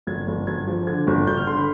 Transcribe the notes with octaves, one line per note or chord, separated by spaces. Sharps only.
G1 G#6
G1
G1 G#6
F3
D3 G#6
G1
G1 G6
F6
D3 C6
B5